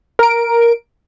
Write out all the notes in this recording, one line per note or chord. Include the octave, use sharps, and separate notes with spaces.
A#4 D7